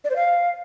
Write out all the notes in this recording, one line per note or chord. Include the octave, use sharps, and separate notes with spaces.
D5
C5
F5